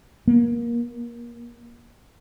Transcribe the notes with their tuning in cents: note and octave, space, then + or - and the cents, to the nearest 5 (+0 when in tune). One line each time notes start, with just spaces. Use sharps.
A#3 +25